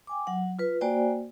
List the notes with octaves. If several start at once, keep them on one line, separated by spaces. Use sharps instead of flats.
G5 G#5 D6
F#3 F#5
F4 B4
A#3 F#4 C5 D5 G5 G#5